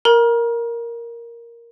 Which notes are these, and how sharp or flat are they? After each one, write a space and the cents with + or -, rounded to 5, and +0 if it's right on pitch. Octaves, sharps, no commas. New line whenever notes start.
A#4 +0 A#5 +35